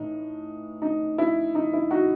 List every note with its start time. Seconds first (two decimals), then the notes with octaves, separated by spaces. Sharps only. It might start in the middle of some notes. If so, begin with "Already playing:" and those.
Already playing: A2 E3 D#4
0.82 D#4
1.18 E4
1.55 D#4
1.73 E4
1.91 D#4 F#4